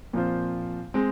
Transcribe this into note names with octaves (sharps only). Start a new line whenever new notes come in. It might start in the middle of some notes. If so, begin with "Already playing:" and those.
A#2 F3 C4 F4 C5
G#3 C4